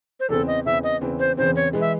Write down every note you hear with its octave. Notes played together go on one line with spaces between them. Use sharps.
C5
E2 C#3 E3 C4 A4
D#5
E2 C#3 E3 C4 E5
D#5
E2 C#3 E3 C4
C5
E2 C#3 E3 C4 C5
C#5
E3 G#3
E5